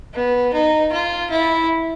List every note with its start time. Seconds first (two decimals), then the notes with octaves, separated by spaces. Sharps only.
0.14 B3
0.53 D#4
0.92 F4
1.31 E4